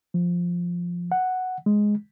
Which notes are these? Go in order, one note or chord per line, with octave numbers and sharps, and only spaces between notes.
F3
F#5
G#3